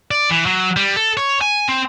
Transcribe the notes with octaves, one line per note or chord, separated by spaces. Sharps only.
D5
E3
F#3
G3
A4
C#5
G#5
C4